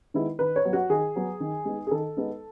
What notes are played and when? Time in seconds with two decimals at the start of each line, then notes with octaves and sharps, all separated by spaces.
0.14 D#3 G#3 B3 E4
0.39 D#3 B4
0.56 C#5
0.65 F#3 B3
0.73 F#4
0.89 D#3 G#4
1.16 F#3 B3
1.40 D#3
1.65 G#3 B3 D#4
1.87 G#4
1.91 D#3 A4
2.17 G#3 B3 D#4